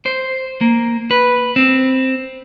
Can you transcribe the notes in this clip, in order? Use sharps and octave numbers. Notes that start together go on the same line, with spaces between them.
C5
A#3
B4
C4